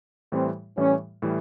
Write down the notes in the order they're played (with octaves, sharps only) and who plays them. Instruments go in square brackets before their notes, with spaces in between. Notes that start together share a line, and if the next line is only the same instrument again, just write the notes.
[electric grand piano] A2 E3 G3 [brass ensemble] C4
[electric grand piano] A2 E3 G3 [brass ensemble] C#4
[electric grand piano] A2 E3 G3